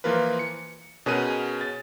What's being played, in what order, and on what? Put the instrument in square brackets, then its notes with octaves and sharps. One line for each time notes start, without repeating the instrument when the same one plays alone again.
[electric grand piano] E3 F3 A#3 F4 A#4 B4
C#7
B2 C#4 G#4 A#4 F#6 D#7
A6